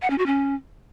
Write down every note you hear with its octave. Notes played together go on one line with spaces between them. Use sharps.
F#5
C#4
F#4
C#4